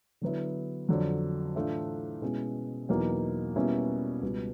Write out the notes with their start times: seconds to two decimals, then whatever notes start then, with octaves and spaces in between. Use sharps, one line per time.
0.21 D3 F#3 B3 E4
0.89 F2 D3 F#3
1.55 A2 E3 A3 D4 F4
2.22 B2 G#3 C#4 E4
2.89 E2 B2 F#3 A#3 D#4
3.56 B2 G3 A#3 C#4 E4
4.23 C#2 B2 G3